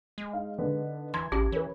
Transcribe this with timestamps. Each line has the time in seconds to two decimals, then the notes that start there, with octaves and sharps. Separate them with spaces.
0.18 G#3
0.33 D#4 F5
0.58 D3 B3 D#4
1.14 E3 A5 C6 G#6
1.32 A1 C#4 G4
1.52 E3 B4 C#5